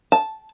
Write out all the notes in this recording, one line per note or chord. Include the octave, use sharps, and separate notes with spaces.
A5